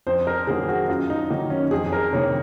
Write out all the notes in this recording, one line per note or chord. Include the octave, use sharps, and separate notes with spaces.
F2 C5
A#4
D#3 F#3 A#3 G#4
F#4
F#2 F4
D#4
D#3 F#3 A#3
C#4
F2 G#4
A#4
C3 D#3 A#3 C#5